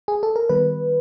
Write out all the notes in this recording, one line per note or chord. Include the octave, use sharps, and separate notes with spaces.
G#4
A4
A#4
D#3 G3 B3 B4